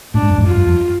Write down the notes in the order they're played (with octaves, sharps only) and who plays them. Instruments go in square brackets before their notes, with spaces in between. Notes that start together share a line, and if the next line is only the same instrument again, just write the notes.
[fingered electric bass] A2 [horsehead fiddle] D4
[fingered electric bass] G#2
F#2
F2 G#2
[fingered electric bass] F#2 [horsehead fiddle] F4
[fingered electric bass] F#2
F2